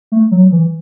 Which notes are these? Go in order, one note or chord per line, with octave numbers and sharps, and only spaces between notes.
A3
F#3
E3